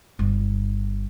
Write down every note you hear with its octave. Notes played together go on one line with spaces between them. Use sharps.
G1